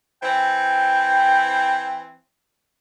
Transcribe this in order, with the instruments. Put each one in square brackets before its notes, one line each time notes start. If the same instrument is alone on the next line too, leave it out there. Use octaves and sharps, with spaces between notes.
[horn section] E3 C4 [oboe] G5